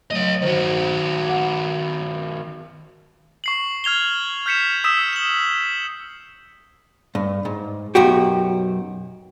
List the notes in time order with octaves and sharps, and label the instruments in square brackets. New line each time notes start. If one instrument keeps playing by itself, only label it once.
[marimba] F#3 A3 [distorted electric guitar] C#5 D#5
[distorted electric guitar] D#3 F#4 [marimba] C5
[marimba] F#5 D6
[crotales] C#6 C7 F#7
F6 G#6 F7 G7
F6 G6 B6 C#7 E7
D#6 E6 B6 E7
E7 F#7
[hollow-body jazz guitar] G2
G#2
B1 F#2 F#4 G4